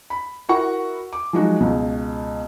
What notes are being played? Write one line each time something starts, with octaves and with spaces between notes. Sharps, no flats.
B5
E4 F#4 A#4 F#5 C#6
D6
F3 F#3 G#3 D#4 F#4
C#2 B2